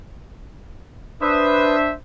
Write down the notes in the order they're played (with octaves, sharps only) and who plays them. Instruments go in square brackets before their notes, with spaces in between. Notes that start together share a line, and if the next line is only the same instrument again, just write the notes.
[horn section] D4 C5 E5 [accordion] B4 D#6